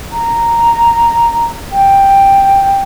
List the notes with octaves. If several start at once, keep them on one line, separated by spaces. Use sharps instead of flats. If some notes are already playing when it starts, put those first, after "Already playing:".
A#5
G5